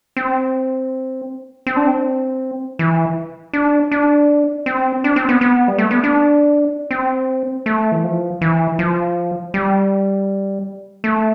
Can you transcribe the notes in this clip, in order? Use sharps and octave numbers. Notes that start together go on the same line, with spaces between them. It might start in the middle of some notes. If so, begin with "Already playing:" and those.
C4
C4
D4
C4
E3
D4
D4
C4
D4
C4
B3
B3
G3
A3
B3
D4
C4
A3
E3
F3
E3
F3
G3
A3